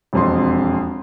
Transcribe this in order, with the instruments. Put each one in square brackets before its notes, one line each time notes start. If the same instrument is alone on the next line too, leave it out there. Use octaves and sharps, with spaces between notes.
[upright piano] E1 F2 C6